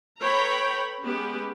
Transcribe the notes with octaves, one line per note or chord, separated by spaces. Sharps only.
A4 B4 C#5 G5 A#5 B5
G#3 B3 C#4 G4